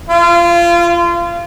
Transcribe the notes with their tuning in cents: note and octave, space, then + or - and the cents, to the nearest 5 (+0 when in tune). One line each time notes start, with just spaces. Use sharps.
F4 -25